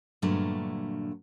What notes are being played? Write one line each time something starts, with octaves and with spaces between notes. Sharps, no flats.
G2 A#2 D3 F#3 A3